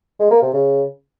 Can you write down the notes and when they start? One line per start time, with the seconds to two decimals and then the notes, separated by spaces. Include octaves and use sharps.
0.20 G#3
0.31 A#3
0.42 C3
0.53 C#3